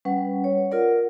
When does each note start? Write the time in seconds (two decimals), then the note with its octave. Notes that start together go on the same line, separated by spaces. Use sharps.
0.05 G3 C#4 B4 F#5
0.44 C#5
0.71 F4 A#4 D5 F#5